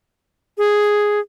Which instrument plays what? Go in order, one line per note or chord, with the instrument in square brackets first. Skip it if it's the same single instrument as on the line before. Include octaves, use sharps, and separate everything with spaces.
[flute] G#4